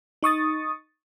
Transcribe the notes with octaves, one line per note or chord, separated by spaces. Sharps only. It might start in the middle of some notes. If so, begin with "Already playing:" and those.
D#4 C#6 D#6 A6